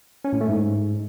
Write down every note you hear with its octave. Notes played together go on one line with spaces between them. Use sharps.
C#4
A2
A3
G#2